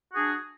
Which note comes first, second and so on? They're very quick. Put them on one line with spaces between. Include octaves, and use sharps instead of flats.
F#4 G#4 D4